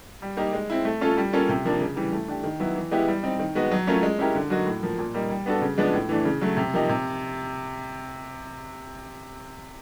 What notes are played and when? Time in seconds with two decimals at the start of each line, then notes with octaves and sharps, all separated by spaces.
0.22 G3
0.37 A#3 D#4 G4 A#4
0.53 G#3
0.70 C4 E4
0.85 A3
1.01 C#4 F4 A4
1.17 G3
1.33 A#3 C#4 F4 A4
1.49 C3
1.65 F3 A#3 D4
1.80 C#3
1.96 E3 G3
2.12 A3
2.28 D4 G4
2.44 D#3
2.60 F#3 B3 E4
2.76 E3
2.91 G#3 B3 E4 G4
3.08 G3
3.23 C4 D#4
3.39 D#3
3.55 G#3 B3 D#4 F#4
3.71 F#3
3.87 A3 C#4 F4 A#4
4.03 G#3
4.19 C#4 E4 G4 A#4
4.35 D3
4.50 F#3 A#3 D#4 F#4
4.66 A2
4.83 F3 A#3
4.99 A#2
5.14 G3 A#3 D#4
5.30 G3
5.46 B3 D4 F#4 A4
5.62 C#3
5.78 F3 G#3 B3 D4
5.93 A2
6.09 E3 A3 D4
6.25 C#3
6.41 F#3 A3
6.57 C3
6.74 F3 A#3 D#4 G4
6.89 C3